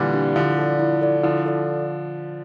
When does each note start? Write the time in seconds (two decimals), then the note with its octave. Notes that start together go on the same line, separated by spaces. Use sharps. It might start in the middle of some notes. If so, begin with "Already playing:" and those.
Already playing: A#2 D3 E3 G3
0.14 D4 G4
0.36 D3 F3 E4
0.58 A4 D5
0.79 E4
1.01 A4 D5
1.23 D3 F3 E4
1.46 A4 D5